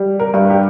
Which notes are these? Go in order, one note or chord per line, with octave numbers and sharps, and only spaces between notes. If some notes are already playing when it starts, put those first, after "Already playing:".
Already playing: G3
A#4
G2
G4